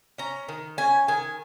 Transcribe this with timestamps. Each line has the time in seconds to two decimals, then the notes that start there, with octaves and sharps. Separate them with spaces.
0.18 C#4 A#5
0.48 D#3
0.78 C#4 G#5
1.08 D#3 G#5